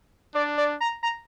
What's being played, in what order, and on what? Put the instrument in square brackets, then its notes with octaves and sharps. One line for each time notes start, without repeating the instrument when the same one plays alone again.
[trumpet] D4 [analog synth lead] D5
[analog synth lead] D5
A#5
A#5